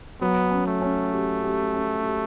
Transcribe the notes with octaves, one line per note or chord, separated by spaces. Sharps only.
F#3 B3
C#4
A3
C#4
G4
G4
C#4
G4